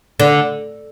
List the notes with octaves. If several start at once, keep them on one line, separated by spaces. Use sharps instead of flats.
D3